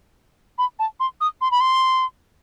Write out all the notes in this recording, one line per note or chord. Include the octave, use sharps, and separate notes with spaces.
B5
A5
C6
D#6
C6
B5
C6